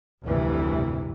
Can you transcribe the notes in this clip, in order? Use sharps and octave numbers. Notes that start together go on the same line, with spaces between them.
F1 D2 G2 C3 E3